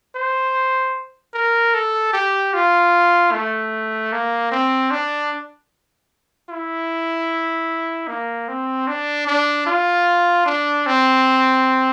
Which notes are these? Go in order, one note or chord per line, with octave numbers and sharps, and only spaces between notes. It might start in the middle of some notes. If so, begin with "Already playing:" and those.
C5
A#4
A4
G4
F4
A3
A#3
C4
D4
E4
A#3
C4
D4
D4
F4
D4
C4